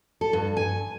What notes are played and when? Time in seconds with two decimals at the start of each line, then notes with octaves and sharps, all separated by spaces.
0.21 A4
0.33 G2
0.57 G#5